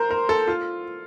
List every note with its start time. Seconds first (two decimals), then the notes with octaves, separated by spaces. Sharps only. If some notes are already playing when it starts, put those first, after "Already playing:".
Already playing: A#4 C5
0.11 A#4
0.29 A4
0.48 F4